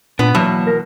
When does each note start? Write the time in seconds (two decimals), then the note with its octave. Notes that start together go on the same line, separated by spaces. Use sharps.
0.19 A#2 B3 D4
0.35 E2 B2 F#3 A#3 A5
0.67 A#4